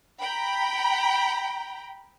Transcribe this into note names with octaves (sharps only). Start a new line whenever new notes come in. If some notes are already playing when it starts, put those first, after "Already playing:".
G5 A#5 B5